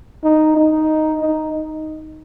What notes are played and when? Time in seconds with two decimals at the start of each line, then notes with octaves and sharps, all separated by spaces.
0.24 D#4
0.57 D#4
1.21 D#4